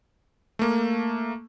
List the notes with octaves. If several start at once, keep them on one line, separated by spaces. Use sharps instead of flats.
A3 A#3